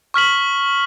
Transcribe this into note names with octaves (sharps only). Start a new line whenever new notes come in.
C#6 F6 B6 F#7